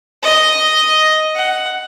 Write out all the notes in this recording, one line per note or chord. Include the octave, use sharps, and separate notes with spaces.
D#5
F#5